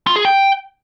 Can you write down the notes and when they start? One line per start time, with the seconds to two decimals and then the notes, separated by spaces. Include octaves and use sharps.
0.07 F4
0.16 G#4
0.25 G5